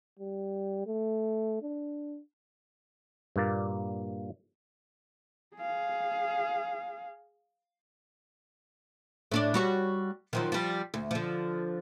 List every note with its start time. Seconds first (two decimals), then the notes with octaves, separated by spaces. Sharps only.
0.19 G3
0.87 A3
1.62 D4
3.36 G2 A#2 A#3 D5
5.56 G#4 F5
9.32 A2 D4 D5
9.54 G3 F#4 C#5
10.33 D#3 F3 F#3
10.52 F3 G3
10.94 D2
11.11 D3 F3